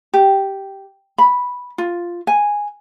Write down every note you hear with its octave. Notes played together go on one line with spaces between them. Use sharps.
G4
B5
F4
G#5